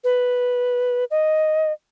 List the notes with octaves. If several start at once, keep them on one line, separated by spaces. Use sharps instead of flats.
B4
D#5